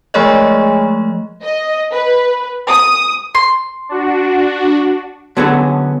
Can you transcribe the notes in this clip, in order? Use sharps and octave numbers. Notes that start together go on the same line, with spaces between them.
F3 G#3 A3 G#4 C#5 D#5
D#5
B4
D#6
C6
D4 F#4
D3 F#3 B3 C#4 G#4 A4